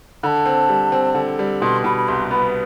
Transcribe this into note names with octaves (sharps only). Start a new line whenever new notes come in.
D3 A5 B5
C4
G3
C4
D3
G3
B2 C6
B2 B5
B5
C2 C6
B3 B5